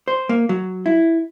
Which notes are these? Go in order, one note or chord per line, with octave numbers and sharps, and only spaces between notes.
C5
A#3
F#3
E4